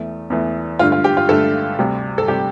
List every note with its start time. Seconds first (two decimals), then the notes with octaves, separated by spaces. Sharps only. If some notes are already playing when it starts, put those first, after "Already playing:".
Already playing: E2 E3 A3
0.30 E2 E3 A3
0.79 G2 D3 A3 F4
0.92 F4
1.04 G4
1.17 F4
1.29 G2 D3 A3 A4
1.79 D2 C3 G3
2.18 A4
2.28 C3 G3 G4